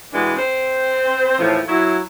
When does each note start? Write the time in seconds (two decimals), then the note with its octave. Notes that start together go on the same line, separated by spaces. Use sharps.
0.13 B2 E3 G3 G#3 B3 D4
0.36 C4 C5
1.38 D#2 A2 E3 F3
1.68 F#3 E4